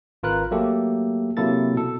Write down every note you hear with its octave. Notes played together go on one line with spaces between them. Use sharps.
G#1 F4 A#4 B4 F#6
F#3 A3 A#3 G4 A4
C3 F#3 A#3 E4 A4 A6
B2 A4